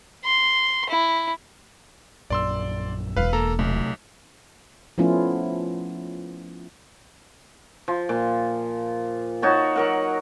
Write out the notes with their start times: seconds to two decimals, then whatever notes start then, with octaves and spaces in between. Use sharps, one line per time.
0.25 C6
0.90 E4
2.30 A#1 F#2 D5 C6 E6
3.17 E1 B4 F5
3.33 A#3 A4 A#5
3.59 B1 C3 A3
4.98 F3 A3 B3 C#4 E4 F4
7.88 F3
8.09 A#2
9.42 D#4 F#4 C#5 A5
9.76 F#3 A#4 F#5